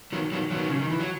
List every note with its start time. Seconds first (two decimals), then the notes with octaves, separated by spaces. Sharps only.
0.12 D#3 F#3
0.32 D#3 F#3
0.51 D#3 F#3
0.69 C#3
0.80 D#3
0.90 E3
0.99 F#3